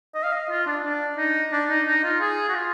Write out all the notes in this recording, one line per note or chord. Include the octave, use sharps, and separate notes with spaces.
D#5
F5
D#5
F4
D4
D4
D#4
D4
D#4
D#4
F4
G#4
F#4
F4